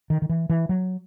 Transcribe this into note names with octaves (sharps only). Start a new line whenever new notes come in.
D#3
D#3
E3
E3
F#3